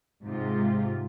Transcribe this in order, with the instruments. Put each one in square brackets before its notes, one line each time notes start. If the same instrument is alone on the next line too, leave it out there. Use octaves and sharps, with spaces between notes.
[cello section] G#2 C3 F4